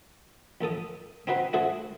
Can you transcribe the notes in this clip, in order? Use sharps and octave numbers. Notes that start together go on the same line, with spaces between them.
A#1 A#2 A4 D#6
C4 D#4 F#4 B4 C5
A3 D4 F#4 G#4 A4 C5